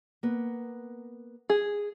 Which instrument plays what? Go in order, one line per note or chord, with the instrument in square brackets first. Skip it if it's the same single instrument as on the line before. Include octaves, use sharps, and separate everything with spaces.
[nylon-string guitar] A#3 B3
[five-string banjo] G#4